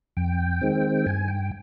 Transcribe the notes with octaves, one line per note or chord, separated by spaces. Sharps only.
F2 G5
D#3 G#3 C4
G2 G#5
G5